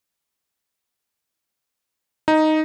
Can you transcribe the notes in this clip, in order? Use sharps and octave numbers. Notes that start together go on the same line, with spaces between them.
D#4